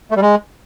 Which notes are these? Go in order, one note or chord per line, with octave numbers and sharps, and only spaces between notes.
A3
G3
G#3